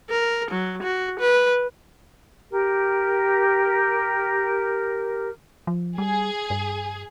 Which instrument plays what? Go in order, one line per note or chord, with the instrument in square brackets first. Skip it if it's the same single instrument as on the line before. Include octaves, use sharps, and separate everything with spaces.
[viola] A#4
F#3
F#4
B4
[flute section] G4 A#4
[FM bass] F3
[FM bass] G3 [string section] G#4
[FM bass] G2